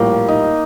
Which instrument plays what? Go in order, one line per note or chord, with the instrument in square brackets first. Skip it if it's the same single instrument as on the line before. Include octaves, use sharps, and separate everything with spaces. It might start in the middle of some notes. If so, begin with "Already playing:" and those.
Already playing: [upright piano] A#1 A2 G3 [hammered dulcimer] A#3
[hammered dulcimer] D#4